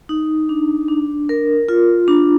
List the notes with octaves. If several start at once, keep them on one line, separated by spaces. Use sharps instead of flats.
D#4
D4
D4
A#4
F4
D4